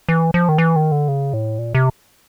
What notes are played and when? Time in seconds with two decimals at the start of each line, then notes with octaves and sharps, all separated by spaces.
0.09 E3
0.34 F3
0.49 D#3
0.58 E3
0.76 D#3
0.92 D3
1.08 C#3
1.33 A2
1.58 A#2
1.75 C3